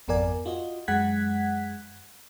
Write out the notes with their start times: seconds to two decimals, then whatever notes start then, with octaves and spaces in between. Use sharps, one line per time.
0.08 G#1 F2 B3 A#4 D5 G#5
0.46 F4 F#4 D#5
0.88 F#2 G#3 F#5 F#6 G#6 B6